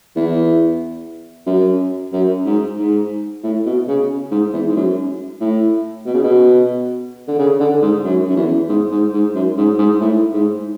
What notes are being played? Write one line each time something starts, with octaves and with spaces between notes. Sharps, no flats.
E2
F#2
F#2
G#2
G#2
A2
B2
C#3
G#2
E2
G#2
F#2
A2
B2
C#3
B2
D3
C#3
D3
G#2
F#2
F#2
E2
G#2
G#2
G#2
F#2
G#2
G#2
A2
G#2